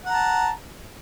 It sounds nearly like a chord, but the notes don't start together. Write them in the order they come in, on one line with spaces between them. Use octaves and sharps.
F#5 A#5 A5